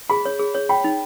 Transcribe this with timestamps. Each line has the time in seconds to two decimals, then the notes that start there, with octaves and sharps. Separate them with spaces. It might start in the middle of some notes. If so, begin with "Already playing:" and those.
0.10 G#4 B5
0.25 C#5
0.39 G#4
0.55 C#5
0.69 G5 B5
0.84 D#4